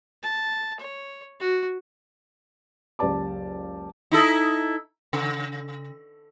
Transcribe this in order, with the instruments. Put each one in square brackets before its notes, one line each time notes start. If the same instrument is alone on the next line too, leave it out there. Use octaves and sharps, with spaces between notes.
[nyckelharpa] A5
C#5
F#4
[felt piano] F#1 C#2 G4 D5 A5 D6
[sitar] D#4 E4 A4
C#3